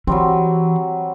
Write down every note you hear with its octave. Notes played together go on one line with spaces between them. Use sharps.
E3 F#3 G3 C4